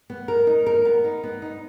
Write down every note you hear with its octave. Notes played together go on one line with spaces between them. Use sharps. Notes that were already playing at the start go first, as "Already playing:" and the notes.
B3
A#4
D#4
A#4
B3
D#4
B3
D#4